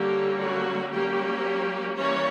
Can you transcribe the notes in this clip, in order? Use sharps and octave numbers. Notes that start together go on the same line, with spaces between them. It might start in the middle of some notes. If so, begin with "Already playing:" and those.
Already playing: D3 G3 A#3 C#4 G4
F#3 F#4
F#3 G3 A#3 C#4 G4
E3 G3 A#3 C#4 C#5